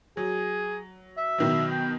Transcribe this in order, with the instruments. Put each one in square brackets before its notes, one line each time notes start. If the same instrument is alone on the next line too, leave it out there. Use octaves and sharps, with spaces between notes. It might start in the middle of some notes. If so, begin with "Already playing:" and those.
[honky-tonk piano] F#3 [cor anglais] G#4
[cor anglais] E5
[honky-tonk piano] B2 D#3 F#3
[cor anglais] G5